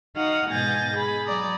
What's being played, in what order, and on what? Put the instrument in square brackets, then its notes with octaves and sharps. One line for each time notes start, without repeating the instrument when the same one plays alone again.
[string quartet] D#4 F#4 F5 F#5 D#6
G#2 B2 G#5 G6 A6 A#6
G#4 B5
F#3 D5 A#5 D#6